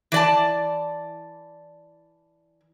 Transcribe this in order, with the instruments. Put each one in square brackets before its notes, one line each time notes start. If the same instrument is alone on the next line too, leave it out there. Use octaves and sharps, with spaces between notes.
[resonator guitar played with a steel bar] E3 D5 A5